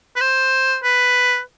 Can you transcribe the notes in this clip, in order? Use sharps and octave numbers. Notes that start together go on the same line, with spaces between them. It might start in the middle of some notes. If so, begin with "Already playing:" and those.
B4
C5
B4